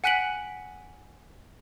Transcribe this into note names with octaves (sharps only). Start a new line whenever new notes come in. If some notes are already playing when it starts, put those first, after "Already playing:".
F#5 G#5 F#6 B6 D7 F#7